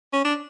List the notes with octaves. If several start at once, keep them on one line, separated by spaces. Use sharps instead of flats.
C#4
D4